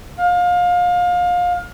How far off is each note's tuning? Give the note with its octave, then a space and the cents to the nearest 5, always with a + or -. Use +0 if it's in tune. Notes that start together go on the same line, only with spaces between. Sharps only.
F5 +30